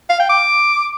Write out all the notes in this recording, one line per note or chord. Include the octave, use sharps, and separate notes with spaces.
F5
G5
D6